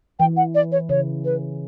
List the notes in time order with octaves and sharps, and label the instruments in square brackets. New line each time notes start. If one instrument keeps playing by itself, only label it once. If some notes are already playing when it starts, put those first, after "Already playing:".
[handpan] E3 [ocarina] G5
[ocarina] F#5
D5
C#5
[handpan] C#3 [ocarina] C#5
[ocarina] B4